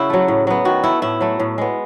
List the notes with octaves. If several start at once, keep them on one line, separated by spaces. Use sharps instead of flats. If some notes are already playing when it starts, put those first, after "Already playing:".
Already playing: C#3 E4 F#4
F#3 A3
A2
F#3 B3
D#3 F#4
A3 E4
A2 E4
F#3 A3
A2
G#3 B3